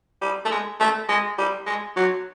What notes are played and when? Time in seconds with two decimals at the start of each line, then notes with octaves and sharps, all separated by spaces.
0.22 G3
0.45 A3
0.51 G#3
0.80 A3
1.09 G#3
1.38 G3
1.66 G#3
1.96 F#3